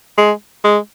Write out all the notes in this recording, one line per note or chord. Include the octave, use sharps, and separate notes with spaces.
G#3
G#3